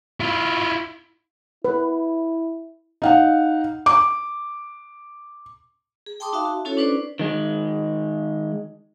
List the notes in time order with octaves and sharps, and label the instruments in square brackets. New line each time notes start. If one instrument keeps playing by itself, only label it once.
[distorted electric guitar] E4 F4
[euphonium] E4 [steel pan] B4
[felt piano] D#4 F5 F#5
D6
[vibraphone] G#4
G5 A5 C6 D6 D#6
D#4 F#4 E5 F5 A5
F#4
C#4 E4 F#4 A4 C#5
C#4 D4 B4 C5 D5
[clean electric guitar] D#3 G#3